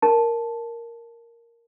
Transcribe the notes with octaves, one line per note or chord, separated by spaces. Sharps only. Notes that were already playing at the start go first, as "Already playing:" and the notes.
A#4 A5